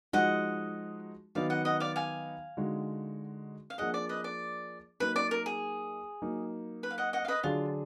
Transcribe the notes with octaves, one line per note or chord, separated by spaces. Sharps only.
F3 G#3 D#4 F#4 D#5 F#5
D#3 F#3 B3 D#4 D5 F5
D#5 F#5
D#5 F#5
D5 F5
F5 G#5
D3 G#3 D#4 F#4
F5
F3 A#3 D4 G#4 D#5 F#5
D5
B4 D#5
D5
F#3 A#3 D#4 B4
D5
A#4
G#4
F#3 A#3 D#4
B4
F5
D#5 F#5
D#5 F#5
F5
B4 D#5
D3 F#3 D4 F4 G#4